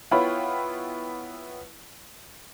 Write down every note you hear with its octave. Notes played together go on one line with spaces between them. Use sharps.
B3 E4 F4 C#5 G5 B5